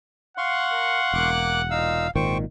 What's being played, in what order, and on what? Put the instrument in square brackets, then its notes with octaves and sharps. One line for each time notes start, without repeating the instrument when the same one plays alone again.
[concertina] F5 C6 C#6 [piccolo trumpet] F#5
[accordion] A#4
[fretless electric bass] E1 [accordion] A#3 D6 F#6
[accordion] A#2 D#4 E6 [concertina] F5
[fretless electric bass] G#1 A#2 D#3 [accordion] E2 [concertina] C5 G5 C#6